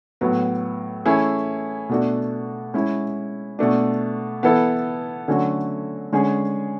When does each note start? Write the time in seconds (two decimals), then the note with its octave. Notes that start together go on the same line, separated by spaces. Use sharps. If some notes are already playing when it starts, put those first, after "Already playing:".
0.21 A2 F#3 B3
1.05 E3 A3 C#4 E4 G#4
1.89 B2 A3 D4 F#4
2.74 G#3 C#4 E4
3.59 B2 A3 D4
4.43 E3 B3 E4 A4
5.28 D3 F#3 A3 C#4 F#4
6.12 D3 G#3 C#4 G#4